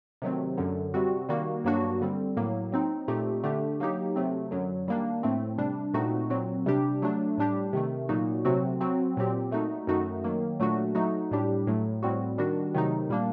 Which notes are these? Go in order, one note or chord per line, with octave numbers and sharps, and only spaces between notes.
C3 D#3 F#3 A3 C4
F#2 D3 F#3
C3 G3 C4 F#4
D#3 G3 A#3 F#4
G2 F#3 A#3 D4 F#4
D3 G3 C4
A2 F#3 A#3
F#3 C4 D#4
A#2 A3 C4 D#4 G4
D3 A3 D4 G4
F#3 A#3 D#4 G4
C3 F#3 A3 C4
F#2 D3 F#3
D#3 G3 A#3 D4
A2 A3 C4
C3 G3 D4
A#2 A3 C4 D#4 F#4
A#2 F#3 C4 F#4
C3 G3 D4 G4
F#3 A3 D4
A2 G3 D4 G4
C3 D#3 A3
A#2 F#3 A#3 D#4 F#4
C3 F#3 A3 C4 F#4
F#3 C4 F#4
A#2 F#3 C4 G4
A#2 A3 D#4 F#4
F#2 D#3 A3 D#4 F#4
D#3 F#3 A#3
A#2 F#3 A3 D4 F#4
F#3 A3 D#4 F#4
A2 G3 D4 G4
A2 F#3 A3
A2 G3 C4 F#4
D#3 G3 D4 F#4
C3 D#3 F#3 A3 D#4
A#2 G3 A#3 D4